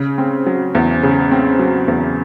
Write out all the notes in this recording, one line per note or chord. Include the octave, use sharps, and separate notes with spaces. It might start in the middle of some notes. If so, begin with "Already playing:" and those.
Already playing: C#3
C4
F#3
E2
C#3
C4
F#3
E2